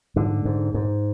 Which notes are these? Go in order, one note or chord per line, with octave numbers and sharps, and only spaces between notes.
G#2 D3
G#2
G#2